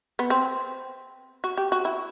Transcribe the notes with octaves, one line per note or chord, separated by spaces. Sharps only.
B3
C4
F#4
G4
F#4
E4